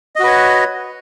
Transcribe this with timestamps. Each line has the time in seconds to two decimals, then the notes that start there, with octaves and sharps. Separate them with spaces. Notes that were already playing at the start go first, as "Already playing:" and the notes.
0.16 D#5
0.19 F#4
0.23 B4
0.27 C#5